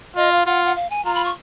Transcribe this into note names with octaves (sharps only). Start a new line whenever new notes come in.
F4 D#5
F5
F4 F#5
F#5
F5
G#5
F4 A#5
B5
C#6